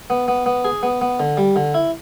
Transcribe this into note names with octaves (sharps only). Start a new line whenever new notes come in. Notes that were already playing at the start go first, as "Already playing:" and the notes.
B3
B3
B3
G#4
B3
B3
D3
G3
D3
E4